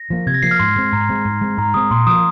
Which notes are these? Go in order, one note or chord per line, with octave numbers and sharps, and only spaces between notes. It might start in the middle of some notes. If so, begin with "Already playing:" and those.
Already playing: A#6
F3 A#3
C3 G#6
A#6
F3 A#3 C7
F6
G#2 C6
G#3 C4
G#2 A#5
G#3 C4
G#2
G#3 C4
G#2 A#5
G#3 C4 D#6
A#2 C6
F3 A#3 D#6